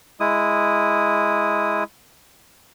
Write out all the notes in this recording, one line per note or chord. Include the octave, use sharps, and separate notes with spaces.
G#3 E4 D#6